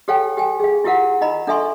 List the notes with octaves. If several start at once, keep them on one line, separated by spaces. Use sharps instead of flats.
G4 A4 C#5 F5 G5 G#5
G4 G5 G#5
G#4 F5
E4 F4 G4 A#4 F5 F#5
D#4 D#5 A#5 B5
D4 A4 E5 G#5 C6 C#6